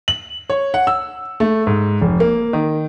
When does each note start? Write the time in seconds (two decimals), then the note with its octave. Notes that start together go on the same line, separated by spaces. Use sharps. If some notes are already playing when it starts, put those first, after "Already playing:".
0.08 F#7
0.50 C#5
0.74 F#5
0.87 E6
1.40 A3
1.67 G#2
2.01 F1
2.20 A#3
2.53 D#3